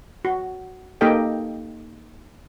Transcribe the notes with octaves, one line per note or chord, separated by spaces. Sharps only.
F#4
A#3 D#4 G4 A4 D#5 G5